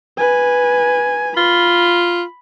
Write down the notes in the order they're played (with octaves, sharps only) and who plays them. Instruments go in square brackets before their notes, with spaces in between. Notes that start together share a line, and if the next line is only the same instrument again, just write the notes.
[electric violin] B4 G#5
[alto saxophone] F4 [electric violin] B5